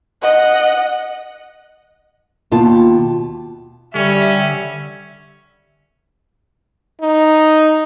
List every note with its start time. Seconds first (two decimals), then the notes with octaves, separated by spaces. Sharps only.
0.22 D#5 F#5
2.52 D#2 B2 F4 A5
3.95 D3 G3 C#4 E5
7.01 D#4